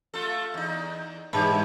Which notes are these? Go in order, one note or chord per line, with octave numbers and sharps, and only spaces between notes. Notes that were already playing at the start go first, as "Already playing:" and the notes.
A3 F4 A4
E2 D#4
G#2 E3 G3 G4 C#5 A5 B5